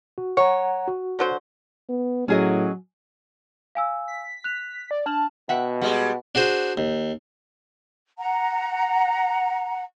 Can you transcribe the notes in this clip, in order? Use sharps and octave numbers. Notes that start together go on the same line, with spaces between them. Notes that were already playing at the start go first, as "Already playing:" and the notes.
F#4
C#5 F#5 A#5
F#4
D3 F#3 C5
B3
A2 F#3 C#4 G#4 D#5
F5 G#5 E6
B6
F#6 F7
D5
D4 A5 F6 F#7
B2 E5 F#5 G5
G3 G#3 G4 F#5
D4 F#4 G#4 C5
D#2
F#5 A#5